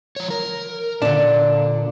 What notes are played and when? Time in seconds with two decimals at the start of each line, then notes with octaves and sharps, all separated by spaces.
0.16 F3 C#5
0.30 A#4
1.02 A#2 D3 D4